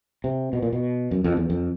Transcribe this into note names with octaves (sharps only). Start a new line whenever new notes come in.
C3
B2
A#2
B2
F#2
F2
E2
F2